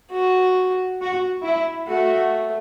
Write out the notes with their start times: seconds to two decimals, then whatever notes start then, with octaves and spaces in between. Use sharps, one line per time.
0.11 F#4
1.01 F#4
1.44 E4
1.89 A3 F#4